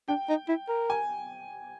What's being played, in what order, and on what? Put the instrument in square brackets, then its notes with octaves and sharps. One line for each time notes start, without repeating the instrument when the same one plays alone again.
[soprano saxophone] D4 [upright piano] G5
[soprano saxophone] D#4
E4
A#4
[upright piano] G#5